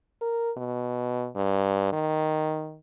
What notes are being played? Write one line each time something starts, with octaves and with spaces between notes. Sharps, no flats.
A#4
B2
G2
D#3